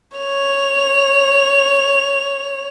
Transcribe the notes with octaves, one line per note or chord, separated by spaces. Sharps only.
C#5 F7